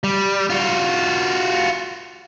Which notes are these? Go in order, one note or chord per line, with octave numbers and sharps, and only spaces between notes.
G3
F4 F#4